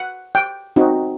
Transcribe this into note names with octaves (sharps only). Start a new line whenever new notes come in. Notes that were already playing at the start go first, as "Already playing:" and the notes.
Already playing: F#5
G5
C4 D#4 F#4